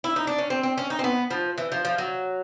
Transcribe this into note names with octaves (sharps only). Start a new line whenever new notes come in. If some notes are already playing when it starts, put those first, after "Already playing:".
E4
D#4
D4
C#4
C4
C4
C#4
D#4
C4
B3
F3
E3
F3
F3
F#3